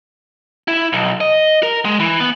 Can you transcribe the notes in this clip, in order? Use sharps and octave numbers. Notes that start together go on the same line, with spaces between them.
E4
B1
D#5
A#4
G#3
E3
B3